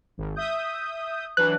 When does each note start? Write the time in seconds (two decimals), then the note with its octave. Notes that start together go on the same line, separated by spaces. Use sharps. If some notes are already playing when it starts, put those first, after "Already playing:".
0.18 G#1
0.36 E5 D#6 G6
1.37 E3 F#3 D4 F#6